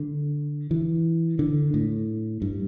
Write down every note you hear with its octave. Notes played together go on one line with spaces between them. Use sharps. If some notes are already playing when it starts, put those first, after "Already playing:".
Already playing: D3
E3
D3
A2
G2